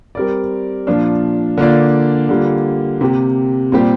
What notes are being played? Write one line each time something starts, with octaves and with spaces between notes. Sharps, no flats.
G3 C4 A#4 D5
A#2 F3 D4 F4
D3 A#3 D4 F4 D5
D3 G3 A#3 F4
C3 A#3 G4
A#2 G3 C4 G4